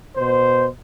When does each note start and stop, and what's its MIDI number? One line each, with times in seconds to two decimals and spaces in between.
0.17 0.66 47
0.17 0.66 72